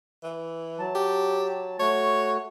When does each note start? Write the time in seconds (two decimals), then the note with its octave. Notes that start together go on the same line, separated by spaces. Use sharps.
0.23 E3
0.79 F#3 A5
0.95 G4
1.80 A3 F#4 C#5